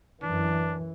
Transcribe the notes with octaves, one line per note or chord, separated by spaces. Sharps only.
F#2 E3 D4